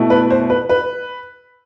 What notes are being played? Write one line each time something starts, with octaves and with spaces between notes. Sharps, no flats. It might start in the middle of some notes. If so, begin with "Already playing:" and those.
Already playing: B2 A3 E4
B4
C5
B4
B4